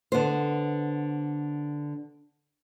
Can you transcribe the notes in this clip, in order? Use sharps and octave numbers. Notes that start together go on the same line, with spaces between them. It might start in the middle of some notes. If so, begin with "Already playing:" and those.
D3 B3 C5